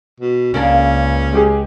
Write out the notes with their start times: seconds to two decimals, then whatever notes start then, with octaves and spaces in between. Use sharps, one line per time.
0.20 B2
0.54 C#2 C#3 A#3 C#4 D4
1.33 G#3 G4 G#4